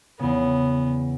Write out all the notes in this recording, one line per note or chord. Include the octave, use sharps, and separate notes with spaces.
E2 C#3 B3